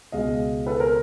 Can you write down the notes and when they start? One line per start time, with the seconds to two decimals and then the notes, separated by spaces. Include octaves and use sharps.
0.12 C#2 B2 G#3 D#5 F5
0.67 A4 B4
0.80 A#4 C5